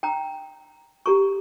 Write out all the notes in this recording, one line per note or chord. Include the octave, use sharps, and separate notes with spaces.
G5 A#5
G4 A4 A#5 C#6